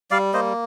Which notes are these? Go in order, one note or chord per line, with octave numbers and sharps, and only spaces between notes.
G3 D5 F5
A#3 C5 D#5